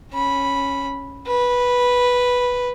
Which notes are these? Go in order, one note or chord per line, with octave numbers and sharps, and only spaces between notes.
C#4 B5
B4